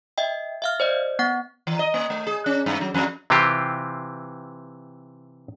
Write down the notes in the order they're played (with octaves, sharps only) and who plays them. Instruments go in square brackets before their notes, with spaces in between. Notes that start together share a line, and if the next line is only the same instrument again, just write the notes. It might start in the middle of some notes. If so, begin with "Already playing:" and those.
[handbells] D#5 E5 G5
E5 F5 F6
C5 D5 D#5
B3 F#5
[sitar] E3
D#5
A#3
A3
G#4
C#4
G2
F#3
F2
[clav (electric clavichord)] C3 E3 C4 F4 G4